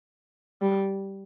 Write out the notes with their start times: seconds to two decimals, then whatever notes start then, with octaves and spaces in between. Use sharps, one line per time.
0.62 G3